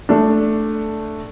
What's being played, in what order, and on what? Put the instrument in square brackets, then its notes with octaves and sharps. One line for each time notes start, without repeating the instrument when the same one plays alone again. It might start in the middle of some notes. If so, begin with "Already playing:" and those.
[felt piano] A3 D4